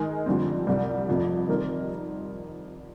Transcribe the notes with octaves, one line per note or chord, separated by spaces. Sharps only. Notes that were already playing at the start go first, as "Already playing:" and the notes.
Already playing: D#3 G#3 D#4 A#4
F2 D3 G3 C4
C2 C3 G3
F1 F2 C3
D#3 G3 C4 D#4 A#4